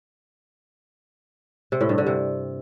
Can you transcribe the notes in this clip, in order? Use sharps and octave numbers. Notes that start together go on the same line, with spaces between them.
C3
A2
G2
D3
C3